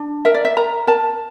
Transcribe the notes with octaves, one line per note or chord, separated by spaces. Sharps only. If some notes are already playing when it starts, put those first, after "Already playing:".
Already playing: D4
A#4 E5
D5
E5
A#4 A#5
A#4 A5